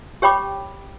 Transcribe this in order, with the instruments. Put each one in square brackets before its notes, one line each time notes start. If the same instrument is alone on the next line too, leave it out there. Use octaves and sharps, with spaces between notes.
[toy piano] G4 C#5 G5 B5 D6